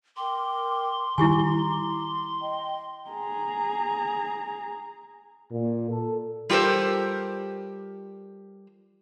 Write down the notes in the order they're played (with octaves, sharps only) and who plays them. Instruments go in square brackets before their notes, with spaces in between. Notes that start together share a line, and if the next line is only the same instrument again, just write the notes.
[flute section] A#4 G5 D6 [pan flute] C6
[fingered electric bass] D#3 G3 [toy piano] E4 G4 G#5 [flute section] A#5 D6
[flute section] D#5 G5
[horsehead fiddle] G#4 A#5
[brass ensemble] A#2
A4
[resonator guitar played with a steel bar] G3 F4 G4 A4 A#4 C5